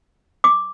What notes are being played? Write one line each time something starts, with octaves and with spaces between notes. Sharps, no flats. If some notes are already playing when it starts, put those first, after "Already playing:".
D6